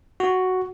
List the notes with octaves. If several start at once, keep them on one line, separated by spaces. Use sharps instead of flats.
F#4